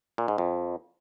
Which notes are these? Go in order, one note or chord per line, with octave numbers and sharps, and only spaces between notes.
A#2
G#2
F2